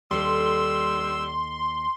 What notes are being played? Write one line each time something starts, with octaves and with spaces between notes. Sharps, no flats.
D#2 G3 A4 C6 E6